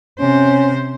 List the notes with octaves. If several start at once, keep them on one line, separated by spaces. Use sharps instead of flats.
C3 C#4 C5